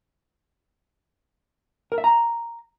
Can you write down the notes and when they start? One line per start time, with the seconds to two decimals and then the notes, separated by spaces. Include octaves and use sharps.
1.92 A#4
1.98 E5
2.04 A#5